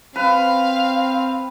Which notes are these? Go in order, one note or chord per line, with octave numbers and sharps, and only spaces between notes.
C4 B4 F5